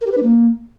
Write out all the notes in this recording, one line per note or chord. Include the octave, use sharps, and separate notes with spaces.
A#4
G4
B4
D4
A#3